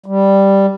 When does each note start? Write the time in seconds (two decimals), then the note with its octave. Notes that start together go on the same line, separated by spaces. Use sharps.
0.06 G3